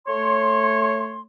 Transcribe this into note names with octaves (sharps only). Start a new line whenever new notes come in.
A3 C#5 C6